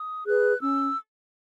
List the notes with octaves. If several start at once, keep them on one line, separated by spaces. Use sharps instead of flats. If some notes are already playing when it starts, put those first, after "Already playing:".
Already playing: D#6
G#4 B4 F#6
C#4 E6